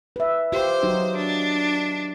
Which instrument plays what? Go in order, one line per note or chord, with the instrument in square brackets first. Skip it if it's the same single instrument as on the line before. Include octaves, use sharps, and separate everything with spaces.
[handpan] B4 E5
[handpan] F4 G4 [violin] C5
[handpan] F#3 D#4 F#4
[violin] D4